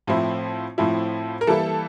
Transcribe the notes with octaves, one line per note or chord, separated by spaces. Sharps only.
A2 F3 C4 E4
A2 F3 C4 E4
A#4
E3 G3 A#3 E4 A4